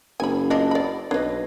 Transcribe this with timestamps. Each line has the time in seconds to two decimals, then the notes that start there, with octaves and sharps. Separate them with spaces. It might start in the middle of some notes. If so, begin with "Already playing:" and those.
0.20 F#1 G#5 B5
0.50 B3 D4 F4 D#5
0.71 D5 B5
1.11 B1 D4 B4 C#5 D#5